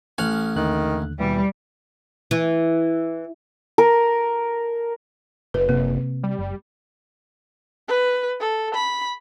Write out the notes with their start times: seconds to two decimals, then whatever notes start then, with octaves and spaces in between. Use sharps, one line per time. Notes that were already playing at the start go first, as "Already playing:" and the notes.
0.18 A1 G#5 C#6 F6 F#6
0.56 D#2 D3 D#3 F#6
1.19 D#2 B2 E3 G3
2.31 E3
3.78 A#4
5.54 F#1 B4
5.69 C3 A#3
6.23 G3
6.38 F#1
7.88 B4
8.40 A4
8.74 B5